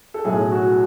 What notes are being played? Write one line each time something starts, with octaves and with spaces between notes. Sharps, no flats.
A4
B1 A2 F#3 G#4
F#4